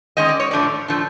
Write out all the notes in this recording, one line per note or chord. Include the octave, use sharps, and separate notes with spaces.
D#3 G#3 C#4 D#5
D5
C#5
A2 F3 A3 D4 D5
A2 F3 A3 D4